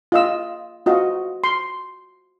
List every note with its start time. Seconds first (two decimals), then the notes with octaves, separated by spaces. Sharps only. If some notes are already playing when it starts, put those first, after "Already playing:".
0.12 F4 D#5 E6
0.86 F4 F#4 D#5
1.44 C6